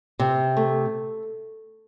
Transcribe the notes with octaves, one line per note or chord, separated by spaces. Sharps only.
C3
A3